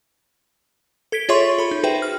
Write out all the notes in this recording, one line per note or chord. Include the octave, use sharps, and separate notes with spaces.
A4 G#6 B6 D7 G7
F4 G#4 C#5 E5 C6 C#6
A4 B5
D#4
F#4 G#4 B4 C5 E5 G5
F6